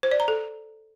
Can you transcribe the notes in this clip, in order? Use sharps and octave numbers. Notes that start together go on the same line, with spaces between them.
C5
D5
A#5
A4